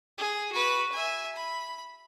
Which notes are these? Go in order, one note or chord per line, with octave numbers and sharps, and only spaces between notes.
G#4
F#4 B4
E5 G#5
B5